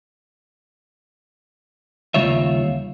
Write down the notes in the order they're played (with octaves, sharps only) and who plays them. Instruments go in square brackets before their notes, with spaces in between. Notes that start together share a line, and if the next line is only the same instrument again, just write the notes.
[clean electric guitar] D#2 C#3 G3 F4 C#5 E5